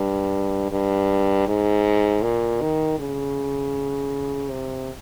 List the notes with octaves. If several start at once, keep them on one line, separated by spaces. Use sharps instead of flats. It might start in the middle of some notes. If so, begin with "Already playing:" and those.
Already playing: G2
G2
G#2
A#2
D#3
C#3
C3